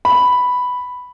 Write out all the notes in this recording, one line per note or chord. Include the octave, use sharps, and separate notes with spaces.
B5